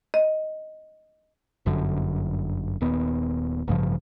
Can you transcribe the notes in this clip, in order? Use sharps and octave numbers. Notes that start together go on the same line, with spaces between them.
D#5
G1 F#2 D3
D#1 D#2 B3
A1 G2 C#3 F3